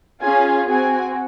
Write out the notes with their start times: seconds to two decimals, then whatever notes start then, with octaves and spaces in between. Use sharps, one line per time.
0.22 C#4 F4 G#4 G#5
0.69 C4 F#4 G#5